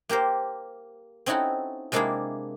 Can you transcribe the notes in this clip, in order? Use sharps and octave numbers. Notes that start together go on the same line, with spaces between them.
A#3 G4 A#4 C5
C4 C#4 D#4 E4 F#4 A4
C3 G#3 A#3 D4 E4 G#4